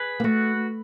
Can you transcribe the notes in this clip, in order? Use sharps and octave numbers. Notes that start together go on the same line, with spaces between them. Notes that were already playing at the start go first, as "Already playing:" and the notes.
Already playing: G#4 B4
A#3
A3 F#4